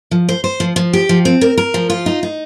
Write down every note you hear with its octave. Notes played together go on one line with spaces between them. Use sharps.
F3
C5
C5
F3
F3
G4
F3
C4
A#4
A#4
F3
F4
D#4
D#4